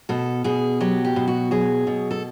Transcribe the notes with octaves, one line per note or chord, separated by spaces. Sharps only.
B2 A4
B2 G#4
F#3 G4
G4
B2
F#4
F#3 G#4
B2
A4